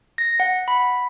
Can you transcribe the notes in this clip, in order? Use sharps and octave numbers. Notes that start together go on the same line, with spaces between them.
A#6
F#5
B5